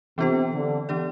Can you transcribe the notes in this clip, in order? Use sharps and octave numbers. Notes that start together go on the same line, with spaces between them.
C3 E3 B3 D4 F4 A4
D3
E3 B3 D4 G4 D5